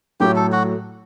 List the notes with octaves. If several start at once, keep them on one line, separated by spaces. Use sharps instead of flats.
A2 F#3 A3 G4
A4
F#4